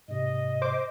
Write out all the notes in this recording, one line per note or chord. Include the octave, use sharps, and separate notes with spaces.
G#2 C3 D#5
C5 D6